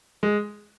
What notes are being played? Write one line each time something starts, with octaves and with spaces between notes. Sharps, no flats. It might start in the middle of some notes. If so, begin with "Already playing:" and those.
G#3